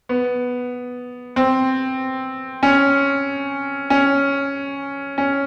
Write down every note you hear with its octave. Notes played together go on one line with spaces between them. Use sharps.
B3
C4
C#4
C#4
C#4